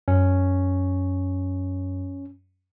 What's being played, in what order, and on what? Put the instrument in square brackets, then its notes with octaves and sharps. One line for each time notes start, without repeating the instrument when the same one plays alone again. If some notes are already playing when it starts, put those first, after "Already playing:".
[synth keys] F#2 [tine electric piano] C#4